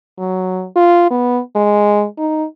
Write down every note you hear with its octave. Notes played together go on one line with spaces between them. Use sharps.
F#3
F4
B3
G#3
D#4